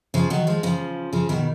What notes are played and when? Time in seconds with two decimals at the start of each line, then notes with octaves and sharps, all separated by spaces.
0.14 C#3 F3
0.30 D#3 F#3
0.47 F3 G#3
0.63 C#3 F3
1.13 C#3 F3
1.29 B2 D#3